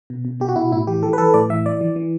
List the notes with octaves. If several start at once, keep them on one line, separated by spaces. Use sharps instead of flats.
B2
B2
B2 G4
F#4
B2 E4
A2 E4
E3 G4
E3 A4
B4
E3 A4
A2 D5
E3 E5
E3 D5
E3
E3